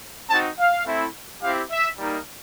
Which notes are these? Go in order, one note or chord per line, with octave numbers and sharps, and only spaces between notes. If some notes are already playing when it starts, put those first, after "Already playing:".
C4 D#4 F#4 A5
F5
A3 C4 E4
C4 E4 G4 F5
E5
G3 A#3 D#4